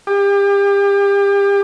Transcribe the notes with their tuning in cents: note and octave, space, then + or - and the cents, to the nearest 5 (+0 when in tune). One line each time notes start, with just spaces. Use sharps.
G4 +35